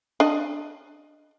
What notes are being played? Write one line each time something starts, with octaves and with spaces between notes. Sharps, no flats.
D4 D#5